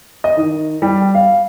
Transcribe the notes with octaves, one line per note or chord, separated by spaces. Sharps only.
D#5
D#3
G3
F5